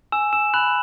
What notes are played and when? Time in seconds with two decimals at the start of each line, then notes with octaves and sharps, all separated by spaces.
0.12 G#5 E6 E7
0.33 E6 E7
0.54 B5 F#6 F#7